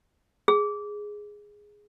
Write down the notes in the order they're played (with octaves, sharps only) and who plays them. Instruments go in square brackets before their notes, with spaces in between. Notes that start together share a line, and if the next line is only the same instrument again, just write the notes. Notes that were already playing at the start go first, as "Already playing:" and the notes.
[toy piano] G#4